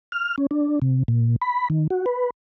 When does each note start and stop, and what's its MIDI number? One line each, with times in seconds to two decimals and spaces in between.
0.12 0.36 89
0.38 0.47 61
0.51 0.79 62
0.82 1.03 48
1.08 1.36 46
1.42 1.68 83
1.70 1.87 51
1.90 2.06 66
2.06 2.30 71